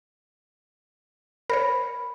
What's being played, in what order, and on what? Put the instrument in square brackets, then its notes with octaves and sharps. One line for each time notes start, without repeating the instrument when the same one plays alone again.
[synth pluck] A#4 C5 C#5 [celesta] B5